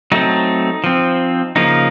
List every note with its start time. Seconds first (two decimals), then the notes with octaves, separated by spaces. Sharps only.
0.12 F#3 A3 C4 D#4
0.84 F3 C4
1.56 C#3 F3 A#3 D#4